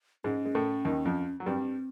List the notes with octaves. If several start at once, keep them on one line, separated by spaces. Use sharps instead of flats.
G#2 G#3 C#4
G#3
A2 A3
D#2 D#3
F2 F3
F#3
G2 G3 C4